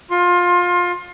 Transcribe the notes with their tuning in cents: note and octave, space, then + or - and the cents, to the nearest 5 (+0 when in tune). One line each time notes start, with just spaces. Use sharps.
F4 +20 C6 +30